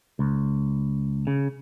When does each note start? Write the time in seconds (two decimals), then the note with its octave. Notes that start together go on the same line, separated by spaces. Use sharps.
0.19 C#2
1.27 C#3